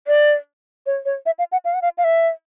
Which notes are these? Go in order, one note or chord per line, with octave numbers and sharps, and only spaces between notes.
D5
C#5
C#5
E5
F5
F#5
F5
F#5
F5
F5
E5